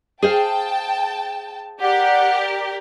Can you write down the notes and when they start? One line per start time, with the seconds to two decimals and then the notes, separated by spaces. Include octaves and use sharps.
0.22 G#4 C5 F5 G5 A5
1.82 G4 A#4 D5 F#5